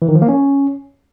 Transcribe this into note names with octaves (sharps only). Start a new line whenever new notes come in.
E3
D#3
F3
A#3
C#4